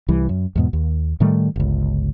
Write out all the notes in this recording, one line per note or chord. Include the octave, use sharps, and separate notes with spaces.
C2 E3 G3
F#2
E2 G#2 B2
D#2
A2 D#3 G3 A3
G1 C#2